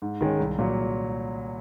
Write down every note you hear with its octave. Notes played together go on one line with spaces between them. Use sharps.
G#2
D#3 G#3 C#4
C2
A#2 F#3